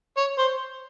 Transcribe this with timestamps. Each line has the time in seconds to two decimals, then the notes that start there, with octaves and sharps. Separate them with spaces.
0.17 C#5
0.38 C5